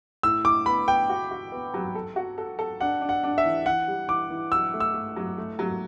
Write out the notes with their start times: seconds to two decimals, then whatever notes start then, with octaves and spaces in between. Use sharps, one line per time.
0.23 A2 E6
0.44 A2 D6
0.66 B3 B5
0.87 B3 G5
1.09 F#4
1.31 F#4
1.52 B3
1.74 F#3
1.95 A4
2.16 F#4
2.38 A4
2.59 A4
2.81 D4 F#5
3.01 D4
3.09 F#5
3.24 D4
3.38 E5
3.44 E3
3.66 E3 F#5
3.87 G3
4.08 E3 D6
4.30 E3
4.51 F#3 E6
4.74 A3
4.80 E6
4.94 A3
5.16 F#3
5.38 A3
5.59 F#3